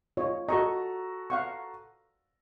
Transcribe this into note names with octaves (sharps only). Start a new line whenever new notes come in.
F4 C#5 D#5
F#4 A4 D#5 A#5 C#6
F5 F#5 C#6